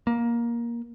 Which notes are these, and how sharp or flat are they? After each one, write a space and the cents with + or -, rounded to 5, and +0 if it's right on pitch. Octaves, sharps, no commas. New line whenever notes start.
A#3 +15